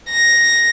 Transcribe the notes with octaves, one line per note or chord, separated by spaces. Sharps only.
A#6